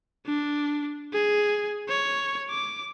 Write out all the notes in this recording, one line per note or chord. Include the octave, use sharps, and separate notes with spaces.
D4
G#4
C#5
D6